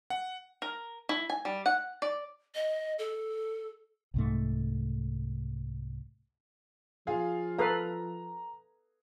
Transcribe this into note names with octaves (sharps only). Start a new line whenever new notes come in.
F#5
A#4
E4
G#5
G3
F#5
D5
D#5
A4
C2 G#2 A3
F3 F4 G#4 F5
A4 B4 F5 A#5